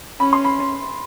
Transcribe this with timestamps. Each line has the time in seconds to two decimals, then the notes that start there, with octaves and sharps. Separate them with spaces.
0.20 C#4 B5
0.33 C6
0.45 B5